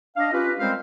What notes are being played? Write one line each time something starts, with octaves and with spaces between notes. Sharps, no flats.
D4 D#5 F5
C#4 F4 G4 B4
G3 G#3 C4 A#4 C5 F5